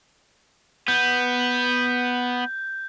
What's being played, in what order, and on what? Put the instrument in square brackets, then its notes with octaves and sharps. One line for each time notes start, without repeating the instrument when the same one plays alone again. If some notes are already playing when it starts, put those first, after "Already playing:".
[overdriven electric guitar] B3 [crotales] G6